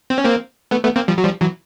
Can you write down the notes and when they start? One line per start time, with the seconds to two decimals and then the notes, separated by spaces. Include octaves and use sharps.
0.10 C4
0.18 C#4
0.25 A#3 C4
0.71 A3 B3
0.84 A3 B3
0.96 A#3 C4
1.08 F3 G3
1.18 F#3
1.24 F3 G3
1.41 E3 F#3